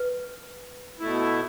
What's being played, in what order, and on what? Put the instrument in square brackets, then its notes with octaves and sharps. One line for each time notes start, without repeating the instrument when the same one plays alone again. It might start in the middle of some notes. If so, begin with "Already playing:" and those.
Already playing: [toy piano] B4
[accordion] B2 A3 E4